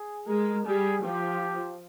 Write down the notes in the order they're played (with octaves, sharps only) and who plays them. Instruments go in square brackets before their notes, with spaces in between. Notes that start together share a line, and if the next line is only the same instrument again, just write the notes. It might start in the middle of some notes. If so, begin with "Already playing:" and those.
Already playing: [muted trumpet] G#4
[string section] G#3 [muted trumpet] A#4
[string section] G3 [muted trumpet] G#4
[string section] F3 [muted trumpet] G4